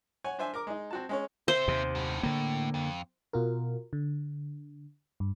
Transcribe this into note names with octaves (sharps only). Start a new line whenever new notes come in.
C#5 F#5 G#5
D4 C5 E5 G#5
A#4 D6
G#3 D#4
C4 F#4 A5
G#3 C#4 C#5
C4 C5 E5
D#2 C3
F#2 A2
A2 D3 A#3
F2
B2 F4 F#4 A#4
D3
G2